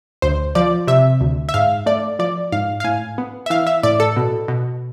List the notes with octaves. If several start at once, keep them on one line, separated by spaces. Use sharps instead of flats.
D2 C5
F3 D5
C3 E5
D2
E5
G#2 F5
A3 D5
F3 D5
G#2 F5
F5
A2 G#5
B3
E5
E3 F5
E5
A2 D5
A4
B2
B2